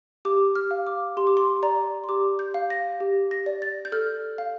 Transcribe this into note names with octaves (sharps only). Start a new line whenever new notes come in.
G4 D6
F6
F5
D6
G4 C6
D6
C6
D5 A#5
C6
G4 D6
G6
F5
A#6
G4
A#6
D5
A6
G6
A4 F6
F5